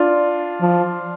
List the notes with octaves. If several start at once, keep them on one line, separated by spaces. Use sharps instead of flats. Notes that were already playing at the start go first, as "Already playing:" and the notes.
Already playing: D4 F4
F3